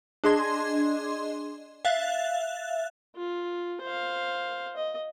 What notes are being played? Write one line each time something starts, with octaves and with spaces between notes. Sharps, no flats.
D4 G#4 D#5 C6 G#6
E5 F5 F#6 A6
F4
C5 F5
D#5